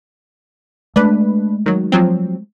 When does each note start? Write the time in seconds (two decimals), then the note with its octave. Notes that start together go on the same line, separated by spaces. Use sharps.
0.96 G#3 A3 D4 B4
1.66 D#3 F#3
1.92 F3 F#3 C4